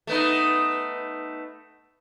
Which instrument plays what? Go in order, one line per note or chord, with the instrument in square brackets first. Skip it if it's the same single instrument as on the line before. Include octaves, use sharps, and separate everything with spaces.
[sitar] A3 B3 D#4